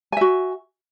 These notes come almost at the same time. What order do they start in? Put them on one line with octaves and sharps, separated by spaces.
G#5 E5 F#4